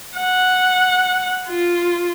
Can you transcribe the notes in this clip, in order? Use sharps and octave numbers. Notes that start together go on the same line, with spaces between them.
F#5
F4